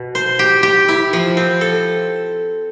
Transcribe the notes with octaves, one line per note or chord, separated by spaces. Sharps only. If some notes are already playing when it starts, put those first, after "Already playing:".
Already playing: B2
C5
G4
G4
E4
F3
C4
A4